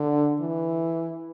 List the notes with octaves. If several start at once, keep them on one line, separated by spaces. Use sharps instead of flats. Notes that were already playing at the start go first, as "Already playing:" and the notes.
Already playing: D3
E3